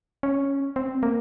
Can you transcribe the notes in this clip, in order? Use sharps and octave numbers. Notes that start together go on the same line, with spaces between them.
C#4
C4
A#3